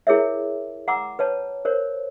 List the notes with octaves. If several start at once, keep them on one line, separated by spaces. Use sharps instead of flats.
E4 G#4 A#4 C#5 E5
F#5 A#5 D6 E6
B4 C#5 A5
A#4 C5 C#5